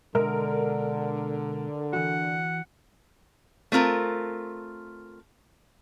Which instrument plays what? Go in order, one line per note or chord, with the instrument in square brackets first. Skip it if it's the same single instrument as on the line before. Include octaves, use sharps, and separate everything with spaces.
[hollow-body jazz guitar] B2 G#3 E5 [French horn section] D3 [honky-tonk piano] A#4
[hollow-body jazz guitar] E3 F#4 [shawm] F#5
[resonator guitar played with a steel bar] A3 C4 F4 A#4